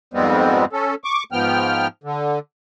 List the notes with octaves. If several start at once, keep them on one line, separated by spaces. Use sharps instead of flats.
F2 G#2 G3 G#3 B3 C4
C#4 A4
C#6 D6
G#2 F3 B3 G5 F6
D3